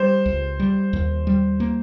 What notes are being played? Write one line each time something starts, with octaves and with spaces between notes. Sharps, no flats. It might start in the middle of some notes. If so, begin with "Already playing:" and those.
Already playing: G3 C5
C#2
G3
D#2
G3
A#3